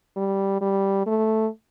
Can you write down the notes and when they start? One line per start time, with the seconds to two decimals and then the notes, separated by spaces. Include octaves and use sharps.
0.17 G3
0.61 G3
1.06 A3